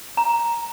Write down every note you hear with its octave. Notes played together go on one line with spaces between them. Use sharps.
A#5